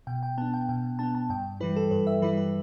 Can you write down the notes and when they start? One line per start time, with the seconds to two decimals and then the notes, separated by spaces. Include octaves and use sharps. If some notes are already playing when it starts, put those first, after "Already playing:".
0.07 B2 G5
0.23 G5
0.38 B3 D4 A5
0.54 G5
0.69 B2 G5
0.99 B3 D4 A5
1.15 A5
1.30 G2 G5
1.60 E3 G3 E4 B4
1.76 A4
1.91 G2 B4
2.07 E5
2.22 E3 G3 E4 B4
2.37 B4